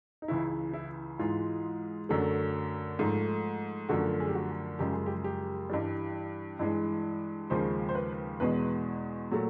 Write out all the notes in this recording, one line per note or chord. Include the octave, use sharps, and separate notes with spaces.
D#4
C#2 C#3 E3 E4
E4
G#2 E3 G#3 F4
F#2 D3 F#3 A3
G#2 F3 A3
F#2 D3 F3 A3 F#4
G#4
G4
F#4
F#2 C#3 F3 G#3 G4
G#4
G4
G4
G2 E3 G3
G2 E3 G#3
D#2 C#3 F3 G#3 C5
C5
B4
E2 B2 G#3 B4
A#2 F#3 A3